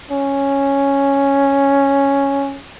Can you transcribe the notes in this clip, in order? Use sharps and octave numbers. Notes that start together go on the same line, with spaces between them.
C#4